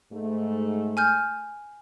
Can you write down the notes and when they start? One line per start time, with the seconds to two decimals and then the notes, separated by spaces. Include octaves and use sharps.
0.12 G#2 A3
0.97 G#5 F6 G6